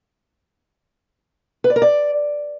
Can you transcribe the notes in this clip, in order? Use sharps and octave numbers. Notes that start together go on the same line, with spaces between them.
B4
D5
A#4
D5